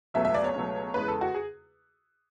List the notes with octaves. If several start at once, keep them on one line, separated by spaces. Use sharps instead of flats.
C#2 B2 F#3 A3 E5
E5
D5
C#5
C#2 B2 F#3 A3
E2 C#3 E3 G#3 B3 B4
A4
F#4
G#4